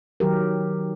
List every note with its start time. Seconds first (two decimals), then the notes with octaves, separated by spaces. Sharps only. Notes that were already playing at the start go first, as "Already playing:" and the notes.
0.20 D#3 F#3 G4 A#4